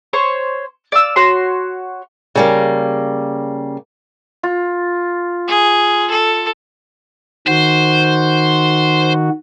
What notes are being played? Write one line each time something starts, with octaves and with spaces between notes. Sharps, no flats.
C5 C#5 C#6
D5 F5 E6
F#4 C#5 C6
C#3 G3 A#3
F4
G#4
A4
D#3 F#4 C5